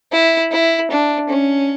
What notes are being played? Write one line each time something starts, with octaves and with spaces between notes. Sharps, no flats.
E4
E4
D4
C#4